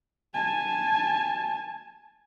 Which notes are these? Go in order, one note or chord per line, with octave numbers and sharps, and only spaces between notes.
G#5 A5